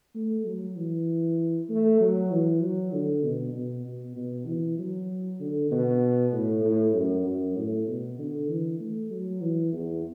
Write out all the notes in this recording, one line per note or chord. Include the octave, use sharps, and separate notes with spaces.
A3
F#3
E3
A3
F#3
E3
F#3
D3
B2
B2
B2
B2
E3
F#3
D3
B2
A2
A2
F#2
F#2
A2
B2
D3
E3
A3
F#3
E3
E2